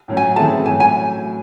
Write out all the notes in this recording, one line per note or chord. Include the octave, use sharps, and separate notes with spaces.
A2 F#3 C#4
G#5
E3 A3 C4 E4 G#4 A5
A2 F#3 C#4 G#5
G#5